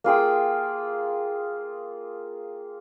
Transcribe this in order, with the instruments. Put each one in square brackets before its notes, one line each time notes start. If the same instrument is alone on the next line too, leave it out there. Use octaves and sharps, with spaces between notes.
[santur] A#3 F4 G#4 G5